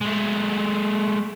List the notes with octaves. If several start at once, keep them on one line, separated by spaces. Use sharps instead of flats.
G#3 A3